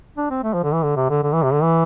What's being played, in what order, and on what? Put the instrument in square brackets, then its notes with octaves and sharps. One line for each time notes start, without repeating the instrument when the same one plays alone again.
[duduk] D4
C4
A3
F3
D3
E3
D3
C3
D3
D3
E3
C3
D3
E3